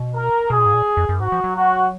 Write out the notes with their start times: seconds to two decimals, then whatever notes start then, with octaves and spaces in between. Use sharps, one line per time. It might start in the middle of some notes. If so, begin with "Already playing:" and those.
Already playing: B2
0.16 A#4
0.50 B2 G#4
0.58 A#2
0.66 G#2
0.74 A#2
0.97 F2
1.09 F#2
1.20 G#2 F#4
1.32 F3
1.44 F#3
1.55 F#4